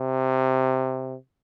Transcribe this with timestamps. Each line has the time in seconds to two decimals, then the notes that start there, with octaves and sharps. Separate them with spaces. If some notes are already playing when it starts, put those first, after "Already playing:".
Already playing: C3